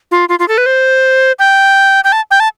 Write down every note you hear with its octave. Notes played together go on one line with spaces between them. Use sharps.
F4
F4
F4
A4
B4
C5
G5
G5
A5
G5
A5